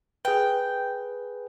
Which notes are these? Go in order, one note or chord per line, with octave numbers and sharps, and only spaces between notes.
G#4 B4 G5